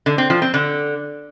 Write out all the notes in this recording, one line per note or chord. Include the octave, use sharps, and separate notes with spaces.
D3
C4
F3
C4
D3